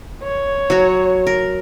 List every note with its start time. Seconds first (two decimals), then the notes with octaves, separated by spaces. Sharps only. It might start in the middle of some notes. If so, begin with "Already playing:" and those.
0.23 C#5
0.70 F#3 F#4
1.27 A#4